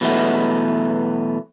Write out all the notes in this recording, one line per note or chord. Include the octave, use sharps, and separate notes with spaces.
B2 E3 F#3 G#3 A3 B3